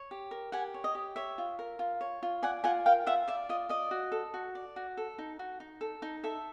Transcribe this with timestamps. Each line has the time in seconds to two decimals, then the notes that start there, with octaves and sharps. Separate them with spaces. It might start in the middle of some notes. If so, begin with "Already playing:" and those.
Already playing: C#5
0.11 G4
0.31 A#4
0.52 G4 F#5 G#5
0.74 C#5
0.84 D#5
0.95 G4
1.16 C#5 E5
1.38 F4
1.59 A#4
1.79 F4
2.01 C#5
2.23 F4
2.43 D5 F#5 G#5
2.64 F4 F#5 G#5
2.86 A#4 F5 G5
3.06 F4 E5 F#5
3.28 D5 E5
3.49 F4 D#5
3.69 D5 D#5
3.91 F#4
4.12 A4
4.34 F#4
4.55 D5
4.76 F#4
4.97 A4
5.18 D#4
5.39 F#4
5.60 D#4
5.81 A4
6.02 D#4
6.24 A4 E5